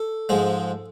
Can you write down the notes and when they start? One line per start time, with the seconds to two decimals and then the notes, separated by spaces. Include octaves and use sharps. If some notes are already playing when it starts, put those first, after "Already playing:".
Already playing: A4
0.29 G#2 F3 G#3